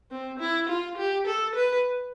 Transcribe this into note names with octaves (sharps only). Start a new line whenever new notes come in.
C4
E4
F4
G4
A4
B4